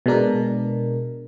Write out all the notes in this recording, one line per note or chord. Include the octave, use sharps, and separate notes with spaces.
B2 G#3 D4 A#4